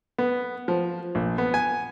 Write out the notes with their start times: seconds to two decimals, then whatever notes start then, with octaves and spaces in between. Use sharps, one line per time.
0.18 B3
0.68 F3
1.15 A#1
1.38 B3
1.54 G#5